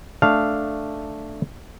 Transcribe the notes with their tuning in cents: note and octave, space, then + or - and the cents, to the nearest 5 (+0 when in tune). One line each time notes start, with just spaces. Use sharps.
A3 +0 D4 +0 F5 +0